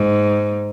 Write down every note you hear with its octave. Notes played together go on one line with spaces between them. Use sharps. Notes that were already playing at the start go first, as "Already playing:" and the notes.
Already playing: G#2